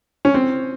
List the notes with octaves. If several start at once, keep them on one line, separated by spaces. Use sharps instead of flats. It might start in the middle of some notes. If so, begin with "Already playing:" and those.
C#4
C4